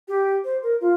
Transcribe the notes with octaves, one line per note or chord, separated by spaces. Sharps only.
G4
C5
A#4
F4